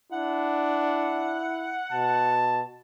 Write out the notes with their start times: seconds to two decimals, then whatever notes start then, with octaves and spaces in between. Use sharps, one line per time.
0.12 D4 E4 F#5
1.92 B2 A5